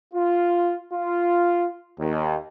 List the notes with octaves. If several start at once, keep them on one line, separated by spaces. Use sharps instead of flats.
F4
F4
D#2